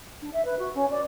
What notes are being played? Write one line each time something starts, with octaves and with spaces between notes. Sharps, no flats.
D4
E5
B4
F#4
C#4
D5